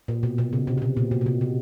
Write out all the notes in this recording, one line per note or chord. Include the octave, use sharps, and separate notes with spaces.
A#2
B2
B2
C#3
C3
C3
B2
A#2
B2
B2
C3
C3